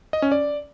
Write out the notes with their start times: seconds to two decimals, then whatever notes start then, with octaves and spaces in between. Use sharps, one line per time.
0.13 D#5
0.22 C#4
0.32 D5